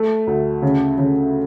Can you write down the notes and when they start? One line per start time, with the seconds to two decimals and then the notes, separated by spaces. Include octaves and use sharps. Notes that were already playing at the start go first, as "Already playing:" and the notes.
Already playing: A3
0.27 D2
0.62 C#3
0.98 C#3